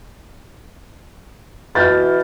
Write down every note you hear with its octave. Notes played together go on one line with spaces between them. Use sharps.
B2 E3 F6 G6 A6